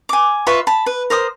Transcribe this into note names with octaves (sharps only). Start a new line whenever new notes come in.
G#5 D6
F4 B4 E5 C#6
A5 B5
B4
A#4 C5 D#6